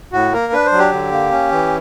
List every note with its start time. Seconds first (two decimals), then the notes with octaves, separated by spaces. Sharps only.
0.12 A2 F#4
0.33 A#3 A#4
0.53 D4 B4
0.65 C5
0.72 F#3
0.79 G4
0.92 D3
1.12 A#3
1.32 C#4
1.52 E3